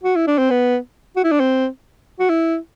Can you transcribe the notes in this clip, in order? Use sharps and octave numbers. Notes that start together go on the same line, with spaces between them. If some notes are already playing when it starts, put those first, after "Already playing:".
F#4
E4
D4
C4
B3
F#4
E4
D4
C4
F#4
E4